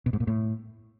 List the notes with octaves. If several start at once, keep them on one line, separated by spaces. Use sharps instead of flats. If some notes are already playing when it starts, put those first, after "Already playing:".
B2
G#2
A#2
A2